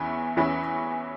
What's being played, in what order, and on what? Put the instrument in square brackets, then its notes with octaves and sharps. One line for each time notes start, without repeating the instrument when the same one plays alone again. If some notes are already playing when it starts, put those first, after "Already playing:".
Already playing: [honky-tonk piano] E2 E3 C#4 E4 B4
E2 E3 C#4 E4 B4